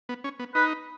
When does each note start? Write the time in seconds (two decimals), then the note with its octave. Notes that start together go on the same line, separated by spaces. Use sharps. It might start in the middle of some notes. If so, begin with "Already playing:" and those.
0.09 B3
0.24 C#4
0.39 B3
0.55 D#4 B4